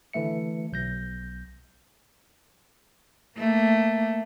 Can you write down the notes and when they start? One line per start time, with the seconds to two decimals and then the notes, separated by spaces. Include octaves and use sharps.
0.13 D3 E3 A3 E5 C#7
0.72 B1 G6 A#6
3.38 A3 A#3